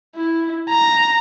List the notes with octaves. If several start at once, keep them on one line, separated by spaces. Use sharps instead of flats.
E4
A#5